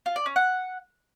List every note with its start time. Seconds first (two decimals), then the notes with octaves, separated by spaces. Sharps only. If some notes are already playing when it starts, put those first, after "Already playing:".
0.06 F4
0.16 D5
0.26 C#4
0.36 F#5